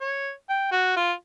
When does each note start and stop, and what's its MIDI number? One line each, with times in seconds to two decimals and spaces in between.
0.01 0.32 73
0.50 0.68 79
0.71 0.95 66
0.96 1.12 65